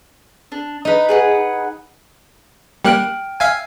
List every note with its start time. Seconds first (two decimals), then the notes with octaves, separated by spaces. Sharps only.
0.52 D4
0.85 D#4 B4 D#5
1.09 G#4 B4 F#5
2.85 G3 A#3 G5 F6 F#6 D7
3.40 E5 F5 G#5